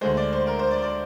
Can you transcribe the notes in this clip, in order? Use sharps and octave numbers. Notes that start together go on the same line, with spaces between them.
D2 D3 G#3 C5
D5
C5
A#4
C5
D5
D5